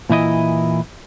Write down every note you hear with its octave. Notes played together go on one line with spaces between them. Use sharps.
A#2 E3 E4 D#5